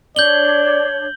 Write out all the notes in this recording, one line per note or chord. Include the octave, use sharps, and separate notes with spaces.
D4 C#5 D5 G6 F#7 G7